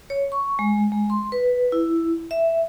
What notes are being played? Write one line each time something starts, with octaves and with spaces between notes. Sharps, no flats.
C#5
C#6
G#3
G#3
C6
B4
E4
E5